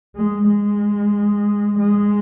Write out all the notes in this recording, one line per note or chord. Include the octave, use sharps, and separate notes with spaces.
G#3
G#3
G#3